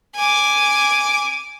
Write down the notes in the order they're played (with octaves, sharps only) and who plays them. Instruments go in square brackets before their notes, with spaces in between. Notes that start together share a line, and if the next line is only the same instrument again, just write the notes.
[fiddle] G#5 D6